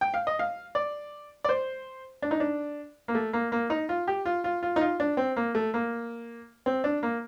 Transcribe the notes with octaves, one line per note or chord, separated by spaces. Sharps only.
G5
F5
D#5
F5
D5
D5
C5
D4
D#4
D4
A#3
A3
A#3
A#3
D#4
F4
G4
F4
F4
F4
D#4
F4
D4
C4
A#3
A3
A#3
C4
D4
A#3